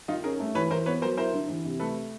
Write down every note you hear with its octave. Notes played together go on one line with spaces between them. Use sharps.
D#3 D#4 F4
C#4 G#4 A#4
A3
E3 B4 C#5
E3 A#4 C5
B3 B4 C#5
F#3 A#4 C5
E4 A#4 C5
D3
E3
C3
A3 A4 B4